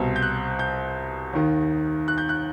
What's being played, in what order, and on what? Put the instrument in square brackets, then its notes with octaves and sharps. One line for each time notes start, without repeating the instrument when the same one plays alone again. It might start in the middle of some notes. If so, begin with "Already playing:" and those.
Already playing: [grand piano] C2 B2
G6
F#6
G6
D#2 D#3
F#6
G6
F#6